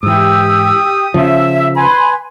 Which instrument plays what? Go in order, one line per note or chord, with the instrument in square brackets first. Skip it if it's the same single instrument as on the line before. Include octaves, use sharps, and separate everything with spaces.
[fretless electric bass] G#2 E3 [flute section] G4 E6 [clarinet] D#6
[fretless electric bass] C#3 F3 [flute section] E5
[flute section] B4 G#5 C6 [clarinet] B5